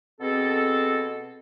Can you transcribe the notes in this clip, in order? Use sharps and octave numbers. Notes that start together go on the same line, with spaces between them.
B2 C4 G#4 A4